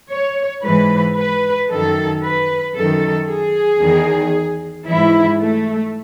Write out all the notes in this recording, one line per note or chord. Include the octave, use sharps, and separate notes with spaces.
C#5
G#2 E3 B4
B4
F#2 D#3 A4
B4
F#2 D#3 A4
G#4
E2 D#3
G#2 E3 E4
A3